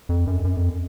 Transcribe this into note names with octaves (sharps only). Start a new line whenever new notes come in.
F2
F#2
F#2
F2